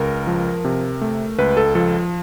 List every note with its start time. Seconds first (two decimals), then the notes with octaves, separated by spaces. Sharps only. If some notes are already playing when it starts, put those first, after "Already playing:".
Already playing: C#2 A#4
0.27 F3
0.65 C3
1.01 A3
1.39 C#2 B4
1.57 A4
1.75 F3 A4